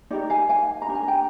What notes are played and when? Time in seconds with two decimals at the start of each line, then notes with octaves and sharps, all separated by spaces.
0.11 D#4 G4 A#4 D5
0.30 F5 G#5
0.49 F5 G#5
0.82 A#5
0.88 D4 G4 A#4
0.95 G#5
1.08 G5 A#5